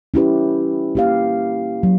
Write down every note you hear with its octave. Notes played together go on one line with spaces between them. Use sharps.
C#4 E4 G4 B4
A#3 G4 F5
F#3